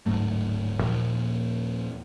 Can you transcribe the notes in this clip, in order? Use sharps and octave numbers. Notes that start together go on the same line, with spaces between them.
D1 G#2 F#3 A3
D#2 A#2 F3